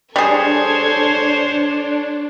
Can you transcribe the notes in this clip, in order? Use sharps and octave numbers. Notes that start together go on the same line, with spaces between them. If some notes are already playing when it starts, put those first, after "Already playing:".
G3 D4 G#4 A4 C5 C#5 G#6